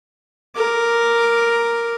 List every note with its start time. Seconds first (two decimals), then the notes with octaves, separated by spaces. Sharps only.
0.56 A#4 D6